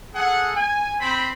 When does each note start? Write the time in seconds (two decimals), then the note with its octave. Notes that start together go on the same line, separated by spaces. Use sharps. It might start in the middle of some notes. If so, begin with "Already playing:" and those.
0.15 G#4 A4 F#5
0.55 G#5
1.00 C4 C5 B5